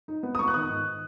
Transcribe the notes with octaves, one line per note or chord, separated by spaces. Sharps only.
D#4
B3
D#6
B3 C#6
F#6
D#3 D#6
G#2